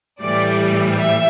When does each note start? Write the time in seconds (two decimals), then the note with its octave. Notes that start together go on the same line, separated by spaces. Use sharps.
0.20 A2 E3 G3 D5
0.99 E5